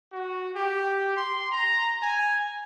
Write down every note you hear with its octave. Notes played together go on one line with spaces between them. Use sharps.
F#4
G4
C6
A#5
G#5